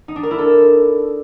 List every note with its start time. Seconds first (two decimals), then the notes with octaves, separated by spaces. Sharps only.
0.08 D#4
0.16 D4
0.23 A#4
0.31 E4
0.38 A4